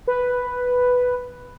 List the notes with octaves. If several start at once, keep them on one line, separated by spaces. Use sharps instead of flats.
B4